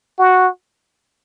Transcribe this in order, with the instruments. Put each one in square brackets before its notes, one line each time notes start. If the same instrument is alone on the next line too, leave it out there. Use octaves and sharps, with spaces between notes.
[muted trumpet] F#4